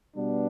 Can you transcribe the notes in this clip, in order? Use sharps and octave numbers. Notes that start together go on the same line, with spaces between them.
B2 G3 B3 D4